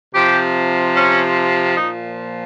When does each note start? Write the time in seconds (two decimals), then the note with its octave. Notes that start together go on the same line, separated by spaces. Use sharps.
0.14 C3 F3 G4
0.96 C#4
1.76 A#2 F3 D#4